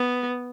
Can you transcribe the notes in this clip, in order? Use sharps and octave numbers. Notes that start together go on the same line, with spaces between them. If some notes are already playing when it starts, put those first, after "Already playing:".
Already playing: B3